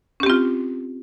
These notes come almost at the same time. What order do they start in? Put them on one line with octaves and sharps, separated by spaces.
C#4 G4 C4 F4